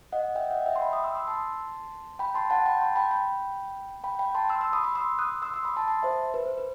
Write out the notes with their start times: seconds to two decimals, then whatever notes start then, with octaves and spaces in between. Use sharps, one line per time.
0.12 D#5 F#5
0.35 E5 G5
0.51 D#5 F#5
0.66 E5 G5
0.76 C6
0.81 G5 B5
0.93 B5 D#6
1.04 C6 E6
1.16 C6 E6
1.28 A5 C6
2.19 G5 B5
2.34 A5 C6
2.50 F#5 A5
2.66 G5 B5
2.81 A5 C6
2.96 G5 B5
3.11 G5 B5
4.04 G5 B5
4.19 G5 B5
4.35 A5 C6
4.49 C6 E6
4.61 C6 E6
4.73 B5 D#6
4.84 B5 D#6
4.95 C6 E6
5.19 D#6 F#6
5.42 C6 E6
5.54 C6 E6
5.65 B5 D#6
5.77 A5 C6
5.88 A5 C6
6.03 C5 E5
6.34 B4
6.46 C5
6.58 B4